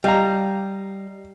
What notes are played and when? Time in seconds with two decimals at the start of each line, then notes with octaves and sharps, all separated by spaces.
0.04 G3 D#5 F5 A#5